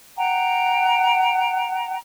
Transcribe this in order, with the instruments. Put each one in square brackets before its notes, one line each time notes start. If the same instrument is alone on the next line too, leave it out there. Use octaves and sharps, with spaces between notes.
[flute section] F#5 G5 A#5